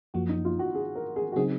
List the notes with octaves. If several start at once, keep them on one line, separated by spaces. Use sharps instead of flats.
F#2 F3 A#3 F#4
D#4
F4
F#4
G#4
A#4
G#4
F#4
C#3 F#3 C4 D#4 G#4